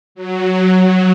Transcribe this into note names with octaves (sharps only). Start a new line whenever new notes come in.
F#3